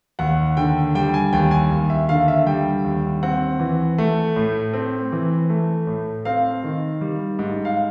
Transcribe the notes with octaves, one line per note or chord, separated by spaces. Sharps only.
D#2 F#5
D3 G5
G3 G5
G#5
D#2 G5
G#5
D#2
E5
D3 F5
E5
G3 G5
D#2
C4 F#5
E3
A3
A2
C4
E3
A3
A2
C4 F5
D#3
G3
G#2
F5